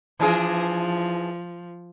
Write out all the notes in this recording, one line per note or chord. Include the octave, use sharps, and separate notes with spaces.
E3 F3 D4 G#4